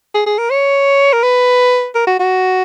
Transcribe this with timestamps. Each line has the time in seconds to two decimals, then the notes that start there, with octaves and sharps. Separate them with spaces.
0.14 G#4
0.26 G#4
0.38 A#4
0.50 C#5
1.13 A#4
1.23 B4
1.95 A#4
2.07 F#4
2.19 F#4